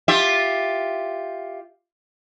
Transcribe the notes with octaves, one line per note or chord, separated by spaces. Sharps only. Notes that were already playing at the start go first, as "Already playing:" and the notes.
F4 G4 E5